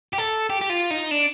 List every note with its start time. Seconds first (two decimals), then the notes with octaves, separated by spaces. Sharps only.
0.13 G4
0.18 A4
0.50 G4
0.61 G4
0.70 F4
0.91 D#4
1.11 D4